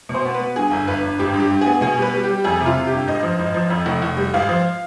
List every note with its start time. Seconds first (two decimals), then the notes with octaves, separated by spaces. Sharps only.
0.09 B2
0.14 C5
0.25 B3
0.34 B4
0.40 B3
0.56 G2 G#4
0.71 G1
0.87 G1 B4
1.02 G1
1.19 G#1 G4
1.34 G2
1.40 G4
1.51 G2
1.61 B3 G#4
1.81 B2 G#4
1.97 G3 B4
2.14 G3
2.24 G3 G4
2.44 F2 G#4
2.60 C3
2.66 F4
2.76 C3
2.87 G1 G4
3.08 G#1 D#5
3.23 F3
3.39 G#1
3.54 F3
3.70 F2
3.86 F1
4.02 F1
4.17 G3
4.34 G#1 F5
4.49 F3